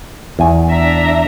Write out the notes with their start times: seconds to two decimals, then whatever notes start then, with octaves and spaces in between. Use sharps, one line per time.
0.39 E2 G#5
0.70 D4 E5 A#5